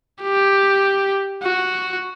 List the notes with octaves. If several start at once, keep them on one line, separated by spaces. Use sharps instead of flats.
G4
F#4